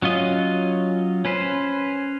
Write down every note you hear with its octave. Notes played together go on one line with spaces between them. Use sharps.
F#3 C#4 F4 D#5
C#4 B4 C5